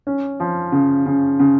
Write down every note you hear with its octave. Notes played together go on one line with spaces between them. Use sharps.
C#4
F3
C#3
C#3
C#3